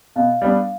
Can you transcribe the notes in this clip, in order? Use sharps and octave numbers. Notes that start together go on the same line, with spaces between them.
B2 F5
G3 B3 D4